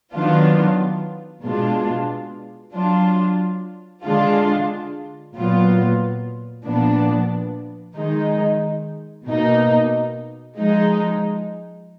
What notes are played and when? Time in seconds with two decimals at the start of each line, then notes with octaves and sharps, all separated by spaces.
0.14 D#3 F#3 B3 D4 F4
1.44 B2 G#3 D4 F4
2.74 F#3 D4 F4
4.04 D3 G#3 D4 F4
5.36 A#2 F#3 B3 F4
6.66 A#2 F3 B3 D4
7.96 D#3 G#3 D#4
9.27 B2 A#3 D#4
10.56 F3 G#3 D#4